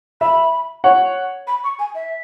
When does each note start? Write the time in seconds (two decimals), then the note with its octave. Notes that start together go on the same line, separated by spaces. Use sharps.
0.21 E5 B5
0.84 C#5 F#5
1.47 B5
1.64 C#6
1.79 G#5
1.95 E5